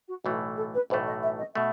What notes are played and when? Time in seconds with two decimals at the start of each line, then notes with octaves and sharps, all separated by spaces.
0.08 F#4
0.24 B1 A2 E3 A3 F#4
0.57 A4
0.74 B4
0.90 B1 A2 E3 A3 C5
1.07 D#5
1.23 E5
1.39 D#5
1.55 B2 A3 E5